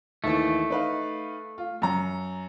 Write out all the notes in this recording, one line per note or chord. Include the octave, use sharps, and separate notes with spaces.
D#2 E3 A3
D#4 B4 F5
F4
F#2 A#5